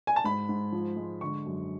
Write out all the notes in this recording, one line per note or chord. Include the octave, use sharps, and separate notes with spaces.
G#5
A5
G#2 B5
G#2
F3
G#3
D3 C#6
F#2